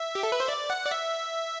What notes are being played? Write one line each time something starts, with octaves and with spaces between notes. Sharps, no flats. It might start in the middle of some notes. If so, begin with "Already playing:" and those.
Already playing: E5
G4
A4
B4
C5
D5
F#5
D5
E5